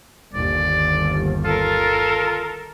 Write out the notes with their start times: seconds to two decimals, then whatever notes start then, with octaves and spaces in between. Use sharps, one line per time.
0.34 G1 D#2 D5
1.45 F4 A4 A#4